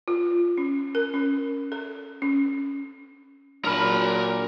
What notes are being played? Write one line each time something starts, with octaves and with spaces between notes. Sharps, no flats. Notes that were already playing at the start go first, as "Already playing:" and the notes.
F4
C#4
A#4
C#4
A4
C#4
A#2 F#3 D4 A#4 B5